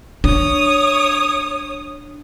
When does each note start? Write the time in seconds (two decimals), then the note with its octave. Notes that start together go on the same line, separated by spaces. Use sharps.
0.24 D4 C#5 D#6